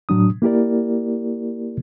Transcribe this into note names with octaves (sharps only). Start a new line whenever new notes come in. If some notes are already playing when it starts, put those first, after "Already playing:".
A2 F#3 D4 D#6
A#3 E4 G4 A#4 D5